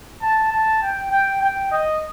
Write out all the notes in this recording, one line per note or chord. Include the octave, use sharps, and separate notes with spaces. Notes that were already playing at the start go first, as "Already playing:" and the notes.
A5
A5
G5
G5
G5
D#5